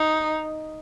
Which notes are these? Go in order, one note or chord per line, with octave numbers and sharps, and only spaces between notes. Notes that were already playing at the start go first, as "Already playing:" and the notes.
Already playing: D#4